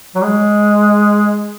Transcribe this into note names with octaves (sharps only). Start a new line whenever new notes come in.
F#3
G#3